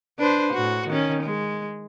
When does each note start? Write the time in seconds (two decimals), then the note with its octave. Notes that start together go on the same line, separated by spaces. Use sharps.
0.19 D4 B4 C5
0.53 A2 F#4
0.88 D#3 C#4
1.23 G#3